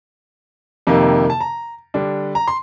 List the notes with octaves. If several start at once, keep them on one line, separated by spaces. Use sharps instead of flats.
F2 C3 D#3 A#3
A5
A#5
D3 G3 D4
A#5
C6